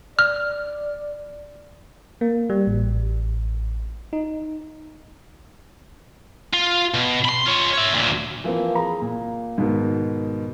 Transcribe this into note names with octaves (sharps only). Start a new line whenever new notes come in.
D5 F6
A#3
G3
A1
D#4
F4
B2
B5 C6
F4 C#5
C#5 E5
D2 A#2
E3 F3 A#3 C4
G#4 A#5
A#2
G#2 B2 D#3